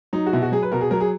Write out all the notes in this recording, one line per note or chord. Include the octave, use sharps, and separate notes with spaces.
F#3 D#4
F#4
B2 E4
F#4
F#3 G#4
B4
B2 A#4
G#4
F#3 A#4
G#4